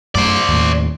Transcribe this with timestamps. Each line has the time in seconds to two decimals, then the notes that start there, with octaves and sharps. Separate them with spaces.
0.15 F#2 A3 C5 D5
0.48 D#2 A2